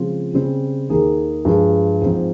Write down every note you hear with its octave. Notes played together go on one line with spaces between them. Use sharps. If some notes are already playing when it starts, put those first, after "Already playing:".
Already playing: C#3 F3 G#3 C4 F4
C#3 G3 C4
D#2 D#3 A#3 D#4 G#4
G2 F3 G#3
G#2 F3 C4